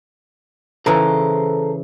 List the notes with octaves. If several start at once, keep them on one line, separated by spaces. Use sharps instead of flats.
C#3 E3 A4 C5 A#5